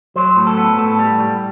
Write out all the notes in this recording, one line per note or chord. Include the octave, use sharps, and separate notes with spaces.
F#3 C5
A2
A4
B3
A2 A4
G3
G3